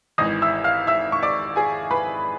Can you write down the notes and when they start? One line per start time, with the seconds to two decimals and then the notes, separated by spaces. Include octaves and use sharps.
0.18 G#1 G#2 E3 D#5 D#6
0.42 E5 E6
0.64 F5 F6
0.87 E5 E6
1.12 C#6
1.23 D5 D6
1.56 G#4 G#5
1.91 B4 B5